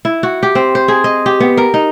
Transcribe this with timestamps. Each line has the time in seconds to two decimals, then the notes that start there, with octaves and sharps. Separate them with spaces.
0.05 E4
0.23 F#4
0.43 G4
0.55 C4
0.75 C5
0.88 G#4
1.04 D#5
1.26 G4
1.40 B3
1.57 A#4
1.74 D#4